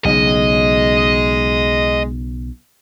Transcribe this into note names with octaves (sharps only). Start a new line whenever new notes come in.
B1 C#3 G#3 D#5